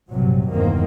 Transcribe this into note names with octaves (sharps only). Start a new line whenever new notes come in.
A#1 G2 C3 F#3 G3
G1 E2 G2 D#3 A#3 C4